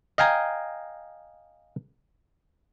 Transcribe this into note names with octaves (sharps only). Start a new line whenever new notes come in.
D#5 F5 G5 G#5 A#5